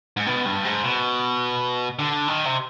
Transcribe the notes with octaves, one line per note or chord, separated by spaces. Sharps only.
G#2
B2
G2
G#2
B2
D3
D#3
C3